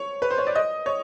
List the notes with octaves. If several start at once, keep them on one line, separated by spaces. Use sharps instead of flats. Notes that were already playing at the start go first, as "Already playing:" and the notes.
Already playing: C#5
B4
C5
C#5
D5
D#5
C#5